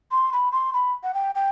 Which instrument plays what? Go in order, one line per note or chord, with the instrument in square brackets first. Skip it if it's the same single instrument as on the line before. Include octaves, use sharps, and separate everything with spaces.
[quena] C6
B5
C6
B5
F#5
G5
G5